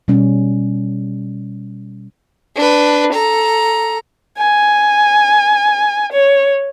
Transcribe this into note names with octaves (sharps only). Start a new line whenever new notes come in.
B2 G3 C#4
D4 B4
A4 A#5
G#5
C#5